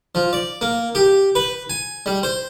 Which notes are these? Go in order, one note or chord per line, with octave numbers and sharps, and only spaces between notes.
F3
D5
A#3
G4
B4
G#5
G3
C5